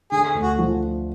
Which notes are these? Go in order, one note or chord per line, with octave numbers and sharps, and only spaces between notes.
D3 G#4
D2
F#4
F3